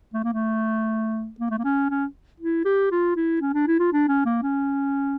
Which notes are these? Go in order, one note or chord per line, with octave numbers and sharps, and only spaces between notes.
A3
A#3
A3
A#3
A3
A#3
C#4
C#4
E4
G4
F4
E4
C#4
D4
E4
F4
D4
C#4
A#3
C#4